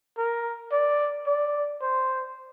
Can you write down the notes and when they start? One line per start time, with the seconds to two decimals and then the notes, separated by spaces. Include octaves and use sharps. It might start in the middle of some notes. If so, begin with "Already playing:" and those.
0.18 A#4
0.71 D5
1.27 D5
1.82 C5